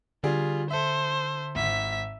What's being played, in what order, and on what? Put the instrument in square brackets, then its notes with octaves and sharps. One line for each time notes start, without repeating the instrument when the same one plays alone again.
[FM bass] D3 [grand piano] G3 G#4 [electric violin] F4
[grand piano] A4 E5 [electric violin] C5
[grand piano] G#1 [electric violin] E5 B6